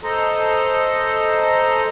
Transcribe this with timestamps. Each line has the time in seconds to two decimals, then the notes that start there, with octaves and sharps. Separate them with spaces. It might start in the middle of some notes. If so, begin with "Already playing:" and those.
0.04 A4 C5 D#5 A#5